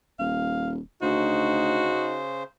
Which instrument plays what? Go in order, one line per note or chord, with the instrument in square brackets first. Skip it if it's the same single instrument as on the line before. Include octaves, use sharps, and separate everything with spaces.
[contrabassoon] D#1 [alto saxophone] F5
[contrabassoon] D2 [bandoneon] C#3 C5 [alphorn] D#4 [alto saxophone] F#4